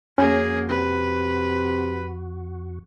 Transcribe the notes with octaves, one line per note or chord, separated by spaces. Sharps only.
F2 A#3 C#4 F#4 G#4
C3 B4